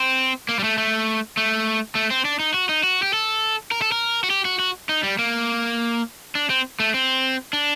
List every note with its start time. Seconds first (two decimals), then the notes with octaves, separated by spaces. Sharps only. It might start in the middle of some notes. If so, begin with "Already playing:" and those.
Already playing: C4
0.49 A#3
0.59 G3
0.64 A3
0.78 A3
1.37 A3
1.95 A3
2.10 C4
2.25 D4
2.39 D#4
2.54 F#4
2.69 D#4
2.84 F#4
3.02 G4
3.14 A4
3.71 A#4
3.82 A4
3.92 A#4
4.24 F#4
4.30 G4
4.45 F#4
4.59 F#4
4.89 D#4
5.03 G3
5.19 A#3
6.35 D4
6.50 C4
6.80 A3
6.94 C4
7.53 D4